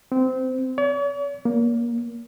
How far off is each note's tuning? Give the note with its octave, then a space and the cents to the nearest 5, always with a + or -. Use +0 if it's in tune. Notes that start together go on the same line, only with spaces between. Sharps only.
C4 -20
C#5 +45
A#3 +20